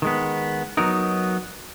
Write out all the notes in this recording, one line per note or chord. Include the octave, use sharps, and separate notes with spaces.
D#3 G#3 B3
F#3 B3 D#4 A#4